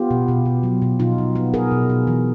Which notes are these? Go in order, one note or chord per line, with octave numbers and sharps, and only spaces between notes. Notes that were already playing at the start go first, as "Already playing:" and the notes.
Already playing: B3 F4 G4
B2
B2
B2
F#3
B2
B2 D#4 F4
B2
B3
B2 G#4 A#4
B2
B2
E3